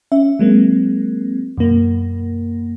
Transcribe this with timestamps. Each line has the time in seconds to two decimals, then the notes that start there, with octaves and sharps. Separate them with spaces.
0.12 C#4 E5
0.39 F#3 G#3 A#3 C4
1.58 F#2 B2 A#3